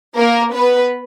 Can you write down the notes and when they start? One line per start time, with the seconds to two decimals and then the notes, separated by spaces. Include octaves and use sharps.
0.16 A#3 A#4
0.54 B3 B4